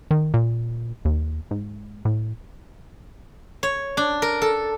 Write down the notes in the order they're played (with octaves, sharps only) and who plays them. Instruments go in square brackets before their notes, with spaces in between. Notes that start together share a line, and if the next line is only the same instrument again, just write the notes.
[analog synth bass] D#3
A#2
D#2
G#2
A2
[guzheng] C#5
D4
A#4
A4